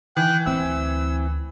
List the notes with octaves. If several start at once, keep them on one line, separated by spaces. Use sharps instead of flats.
E3 G5 F#6
D2 C4 E4 E6